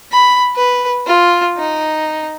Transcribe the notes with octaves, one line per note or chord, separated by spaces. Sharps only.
B5
B4
F4
D#4